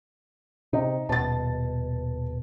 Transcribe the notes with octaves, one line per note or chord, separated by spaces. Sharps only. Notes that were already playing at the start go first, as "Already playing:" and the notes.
C3 D#4
D#1 B2 A5 A6